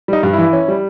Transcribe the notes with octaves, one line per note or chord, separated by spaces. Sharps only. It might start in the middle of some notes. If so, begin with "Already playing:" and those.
G3 D#4
G2
E4
E3
C#4
G3